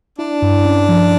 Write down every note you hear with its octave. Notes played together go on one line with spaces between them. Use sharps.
D4 E4
G2
C#4
F3